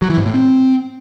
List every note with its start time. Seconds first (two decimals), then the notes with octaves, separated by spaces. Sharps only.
0.02 F#3
0.10 E3
0.18 G#2
0.26 A2
0.34 C4